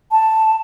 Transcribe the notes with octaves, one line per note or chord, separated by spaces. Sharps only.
A5